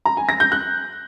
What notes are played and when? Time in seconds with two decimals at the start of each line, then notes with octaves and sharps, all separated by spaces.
0.05 A#5
0.17 G#5
0.29 A#6
0.40 G6
0.52 F#6